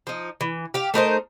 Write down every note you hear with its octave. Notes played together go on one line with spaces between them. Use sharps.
F3 D#4
E3
G4 F5
A3 D#4 A#4 C5